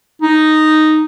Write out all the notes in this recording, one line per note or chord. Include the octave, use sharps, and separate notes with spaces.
D#4